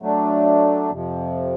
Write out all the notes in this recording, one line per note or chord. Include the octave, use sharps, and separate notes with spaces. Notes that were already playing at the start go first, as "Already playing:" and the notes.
F#3 A3 D4
F2 C3 F3